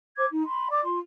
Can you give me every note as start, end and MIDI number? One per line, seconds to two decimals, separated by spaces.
0.17 0.26 72
0.17 0.26 86
0.17 0.26 92
0.30 0.42 63
0.45 0.67 83
0.45 0.67 84
0.69 0.81 74
0.69 0.81 86
0.84 0.98 65
0.84 0.98 84